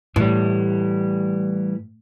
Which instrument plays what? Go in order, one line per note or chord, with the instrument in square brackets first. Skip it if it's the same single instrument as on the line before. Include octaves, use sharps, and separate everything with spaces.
[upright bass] A2 [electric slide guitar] E3 G3